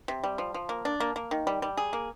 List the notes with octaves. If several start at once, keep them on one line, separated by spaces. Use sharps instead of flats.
C3
G3
F3
F3
A#3
D4
A#3
A#3
D#3
G3
G3
G#4
A#3